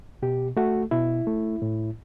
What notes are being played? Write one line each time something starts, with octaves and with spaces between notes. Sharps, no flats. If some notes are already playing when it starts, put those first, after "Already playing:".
B2 G4
A3 F#4
B2 E4
A3
A2